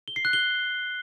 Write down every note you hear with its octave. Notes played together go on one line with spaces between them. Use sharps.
G7
C7
F#6
G7